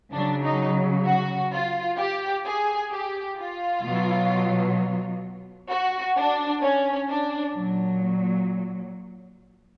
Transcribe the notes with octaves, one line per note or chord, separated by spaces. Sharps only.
C#3 F#3 D4
D#4
F#4
F4
G4
G#4
G4
F4
B2 F#3
F#4
D4
C#4
D4
A#2 F#3